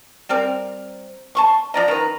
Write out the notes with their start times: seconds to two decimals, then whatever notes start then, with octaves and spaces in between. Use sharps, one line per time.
0.29 G3 C4 A#4
1.35 A5 C6 C#6
1.74 F3 D5 D#5 A#5
1.88 D#3 B4